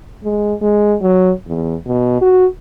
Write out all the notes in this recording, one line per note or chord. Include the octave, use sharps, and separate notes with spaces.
G#3
G#3
F#3
E2
B2
F#4